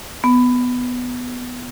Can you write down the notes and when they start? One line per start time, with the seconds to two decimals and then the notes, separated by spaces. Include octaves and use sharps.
0.24 B3